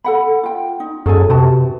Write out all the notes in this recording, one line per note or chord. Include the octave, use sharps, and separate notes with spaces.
A4 F#5 B5
F4 G5
D#4
F#2 G#4 A4 G#5
C3 F#4 B4 A5